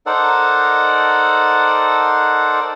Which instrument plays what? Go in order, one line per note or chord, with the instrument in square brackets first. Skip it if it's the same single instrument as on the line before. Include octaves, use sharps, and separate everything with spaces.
[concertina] D#4 A4 A#4 C5 D5 F#5